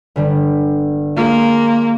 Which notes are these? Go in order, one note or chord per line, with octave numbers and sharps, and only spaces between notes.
G1 D3 G3
G#3 A#3 F4 G#4